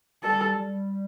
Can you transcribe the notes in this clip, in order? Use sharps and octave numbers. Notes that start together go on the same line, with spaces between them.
G3 A4
G3